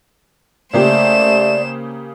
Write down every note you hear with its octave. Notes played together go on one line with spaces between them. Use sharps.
C#3 A3 A#3 G4 C5 D5 E7